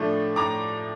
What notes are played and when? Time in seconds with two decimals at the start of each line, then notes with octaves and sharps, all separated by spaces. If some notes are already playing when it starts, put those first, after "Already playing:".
Already playing: A2 F3 A3 D4
0.36 A2 A#5 D6